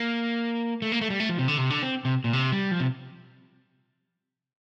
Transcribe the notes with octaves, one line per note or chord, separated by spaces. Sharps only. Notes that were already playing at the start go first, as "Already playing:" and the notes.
Already playing: A#3
A3
A#3
A3
G3
A3
F3
C3
D3
C3
D3
C4
C3
A#2
C3
G3
F3
C3